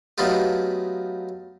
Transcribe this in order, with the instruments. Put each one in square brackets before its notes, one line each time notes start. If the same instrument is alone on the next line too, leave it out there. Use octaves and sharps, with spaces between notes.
[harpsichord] F#3 A3 B3 D#4 F4 G4